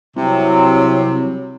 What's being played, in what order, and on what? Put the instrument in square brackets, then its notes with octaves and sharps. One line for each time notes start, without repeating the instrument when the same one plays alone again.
[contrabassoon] C2 [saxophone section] C3 [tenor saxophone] F#3